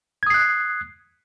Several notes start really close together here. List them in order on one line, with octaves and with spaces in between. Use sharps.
G#6 D#6 C7 F#6